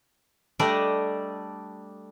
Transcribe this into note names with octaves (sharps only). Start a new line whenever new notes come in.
G3 A3 D4 D#5